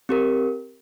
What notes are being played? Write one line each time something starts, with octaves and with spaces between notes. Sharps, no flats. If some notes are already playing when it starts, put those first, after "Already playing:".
C4 G4 A#4